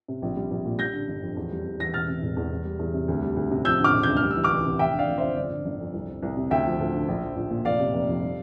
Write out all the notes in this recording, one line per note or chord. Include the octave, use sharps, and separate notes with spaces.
C3
A#1
G3
A#1
A#2
G3 G6 A#6
D3
G1
F2
E2
G3
E2
E3 A#6
E1 F6 A6
C3
E1
E2
E2
G3
E2
C3
D2
G3
D2
C3
F3 E6 G6
D3 D6 F6
E1
D2 G6
F6
G3
E6
E3
D6 F6
C2
C3
F1 E5 G5
D3
D5 F5
F1
F2 C5 E5
G1 D5
D3
G1
F2
C2
F3
C2
C3
D2 E5 G5
F3
D2
D3
A#1
F3
A#1
A#2
F1 D5 F5
C3
F1
F2
G3